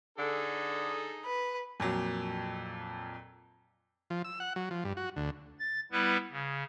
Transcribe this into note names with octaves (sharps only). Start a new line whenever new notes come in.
D3 D#4 G#4 A4
B4
F2 A#2 F#3
F3
E6
F#5
F#3
F3
G2
F#4
D2
A6
G3 B3 E4 B4
C#3